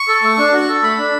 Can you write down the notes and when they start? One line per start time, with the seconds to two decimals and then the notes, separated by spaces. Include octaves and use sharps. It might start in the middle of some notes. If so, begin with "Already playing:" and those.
Already playing: C#6
0.08 A4
0.22 A3
0.38 D4
0.53 F#4
0.68 A4
0.82 A3 B5
0.98 D4